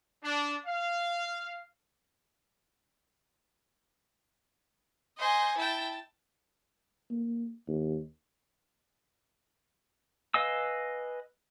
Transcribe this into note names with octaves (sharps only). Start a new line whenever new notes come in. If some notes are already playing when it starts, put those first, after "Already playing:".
D4
F5
C5 D#5 G#5
E4 G5 A5
A#3
D#2
B4 D#5 F5 G#5 E6